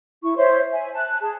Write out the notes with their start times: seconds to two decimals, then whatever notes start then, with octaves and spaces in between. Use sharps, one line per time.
0.22 E4 C#6
0.37 C5 C#5 E5 C6
0.72 E5 G#5
0.94 A5 F#6
1.21 G#4 A5